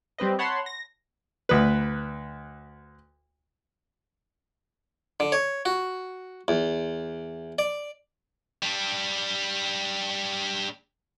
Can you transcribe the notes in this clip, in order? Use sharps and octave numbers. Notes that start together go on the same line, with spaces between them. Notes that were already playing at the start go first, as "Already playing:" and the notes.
G3 C4 B4 D#5
C#5 F#5 A5 B5 C6
A#6
D2 B4
D3
C#5
F#4
E2
D5
G3 D4